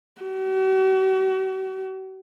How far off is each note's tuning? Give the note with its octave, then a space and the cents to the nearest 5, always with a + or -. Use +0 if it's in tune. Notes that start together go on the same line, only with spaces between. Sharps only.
F#4 +45